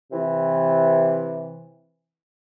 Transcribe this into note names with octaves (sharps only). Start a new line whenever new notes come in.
C3 E3